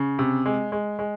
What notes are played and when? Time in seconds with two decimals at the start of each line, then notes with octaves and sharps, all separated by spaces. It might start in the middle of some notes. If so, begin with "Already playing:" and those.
Already playing: C#3
0.19 C3
0.46 G#3
0.72 G#3
0.99 G#3